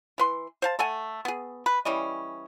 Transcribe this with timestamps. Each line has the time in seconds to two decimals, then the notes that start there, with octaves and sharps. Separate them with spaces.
0.18 E3 B4 C6
0.62 C5 F5 A5
0.79 A3 A4 F#5 G#5
1.25 B3 G#4
1.66 B4
1.85 E3 G3 C#4 D#5